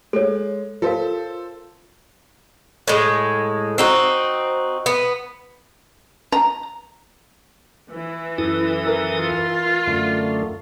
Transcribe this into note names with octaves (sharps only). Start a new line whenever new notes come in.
G#3 A4 C#5
F4 A4 A#4 C5 F5
A2 G#3
C4 D#4 F#4
B3
A#5
E3
F#2 E4 A4 D#6
A#4
F4
F#2 D3 A3